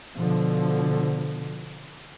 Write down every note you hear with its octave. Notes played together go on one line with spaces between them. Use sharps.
B2 D3 F3